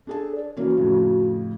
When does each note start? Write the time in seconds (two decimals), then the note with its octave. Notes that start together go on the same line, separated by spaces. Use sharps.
0.07 D4 G#4 A4 A5
0.35 D5
0.57 E3 A#3 C#4 F#4
0.77 F2 A2 C#3